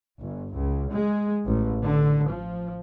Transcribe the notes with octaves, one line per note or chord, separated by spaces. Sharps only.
G1
C#2
G#3
A1
D3
F3